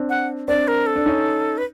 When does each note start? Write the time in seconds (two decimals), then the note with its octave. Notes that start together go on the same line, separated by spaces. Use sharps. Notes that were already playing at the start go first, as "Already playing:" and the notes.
Already playing: C4 D4
0.09 F#5
0.48 C4 D4 D5
0.68 A#4
0.87 A4
0.96 D4
1.06 C#4 D#4
1.58 B4